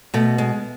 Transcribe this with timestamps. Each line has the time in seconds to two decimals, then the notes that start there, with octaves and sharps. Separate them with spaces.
0.14 B2 A3
0.38 G#3